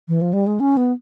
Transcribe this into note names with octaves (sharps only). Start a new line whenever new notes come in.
E3
F3
G3
G#3
C#4
B3